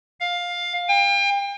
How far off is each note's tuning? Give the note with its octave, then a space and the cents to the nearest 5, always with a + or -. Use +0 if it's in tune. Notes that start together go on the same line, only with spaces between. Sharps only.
F5 +15
G5 +35